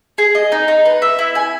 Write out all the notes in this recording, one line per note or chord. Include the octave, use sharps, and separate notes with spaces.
G#4
D#5
D#4
D#4
B4
E5
E4
G#5